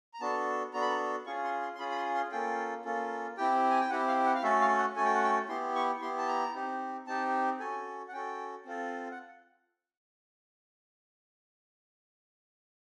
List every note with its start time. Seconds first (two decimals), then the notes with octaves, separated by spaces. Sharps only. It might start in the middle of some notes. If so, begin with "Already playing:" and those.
0.14 A#5
0.21 B3 D4 F#4 A4 A5
0.73 B3 D4 F#4 A4 A#5
0.82 B5
0.90 A#5
1.26 C#4 F4 G#4 C#6
1.44 C6
1.61 C6
1.75 C6
1.79 C#4 F4 G#4 B5
1.91 B5
1.96 C6
2.15 C6
2.32 A#3 C#4 F4 A4 G5
2.85 A#3 C#4 F4 A4
3.37 C4 E4 G4 G5
3.70 G#5
3.80 G5
3.90 C4 E4 G4 F#5
4.08 F5
4.26 F#5
4.35 F5
4.43 A3 C#4 F#4 A4 E5
4.61 F5
4.78 F#5
4.96 A3 C#4 F#4 A4 G#5
5.05 G5
5.14 F#5
5.23 G5
5.49 B3 E4 G4 C6
5.75 C#6
6.02 B3 E4 G4 C6
6.18 A5
6.28 A#5
6.54 C4 D#4 G4
7.07 C4 D#4 G4 A5
7.60 C#4 F#4 A4 G#5
8.08 F#5
8.13 C#4 F#4 A4 G5
8.66 C4 F4 A4
9.11 F#5